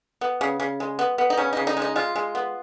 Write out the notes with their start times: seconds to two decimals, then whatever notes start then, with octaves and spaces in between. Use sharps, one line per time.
0.21 B3
0.41 C#3
0.60 C#3
0.80 G#3
0.99 B3
1.18 B3
1.30 D#4
1.37 C#3 C#4
1.53 C#3 D#4
1.67 D#4
1.77 G#3
1.82 D#4
1.96 G#3 F4
2.16 G#3
2.35 B3